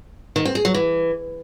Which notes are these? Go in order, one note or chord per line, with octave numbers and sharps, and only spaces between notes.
D#3
C4
G#4
F#3
E3